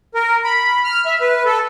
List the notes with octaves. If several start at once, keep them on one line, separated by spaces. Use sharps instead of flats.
A#4
B5
F6
E5
B4
A4